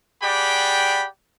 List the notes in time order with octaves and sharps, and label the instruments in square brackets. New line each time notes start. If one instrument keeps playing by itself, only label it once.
[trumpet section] G4 G#4 D5 F#5 G5 B5